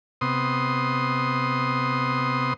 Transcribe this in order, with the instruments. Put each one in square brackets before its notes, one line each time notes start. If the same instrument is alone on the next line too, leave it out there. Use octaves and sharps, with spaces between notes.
[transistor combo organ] C3 B3 C6 D#6